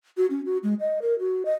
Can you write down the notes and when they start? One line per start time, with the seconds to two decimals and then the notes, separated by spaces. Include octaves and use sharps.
0.17 F#4
0.30 C#4
0.45 F#4
0.63 G#3
0.80 D#5
1.02 A#4
1.19 F#4
1.45 D#5